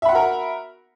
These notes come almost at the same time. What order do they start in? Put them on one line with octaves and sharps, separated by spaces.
E5 B5 F#5 F#4 A#4